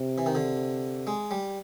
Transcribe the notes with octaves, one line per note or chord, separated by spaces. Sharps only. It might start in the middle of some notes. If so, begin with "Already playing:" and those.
Already playing: C3
E3
D#3
D3
G#3
G3